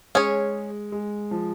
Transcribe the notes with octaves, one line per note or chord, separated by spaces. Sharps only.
G#3 C#4 G#4 C#5
G#3
F3